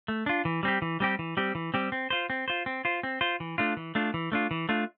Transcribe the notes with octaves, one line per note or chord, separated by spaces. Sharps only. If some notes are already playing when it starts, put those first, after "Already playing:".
A3
D4 F4
E3
G3 C4 G4
E3
G3 C4 G4
E3
G3 C4 G4
E3
G3 C4 G4
C4
F4 C5
C4
F4 C5
C4
F4 C5
C4
F4 C5
E3
A3 D4 F4
E3
A3 D4 F4
E3
A3 D4 F4
E3
A3 D4 F4